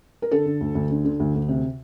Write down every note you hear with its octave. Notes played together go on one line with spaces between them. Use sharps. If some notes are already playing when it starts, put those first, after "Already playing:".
A#4
D3 A4
D3
D2
D2
D3
D3
D2
D2
C3